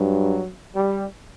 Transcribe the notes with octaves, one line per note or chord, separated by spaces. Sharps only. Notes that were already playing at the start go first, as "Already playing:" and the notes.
Already playing: G2 F#3
G3